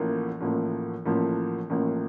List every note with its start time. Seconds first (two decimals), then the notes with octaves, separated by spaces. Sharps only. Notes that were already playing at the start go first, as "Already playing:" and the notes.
Already playing: A1 A2 F3 A#3
0.41 A1 A2 F3 A#3
1.06 A1 A2 F3 A#3
1.70 A1 A2 F3 A#3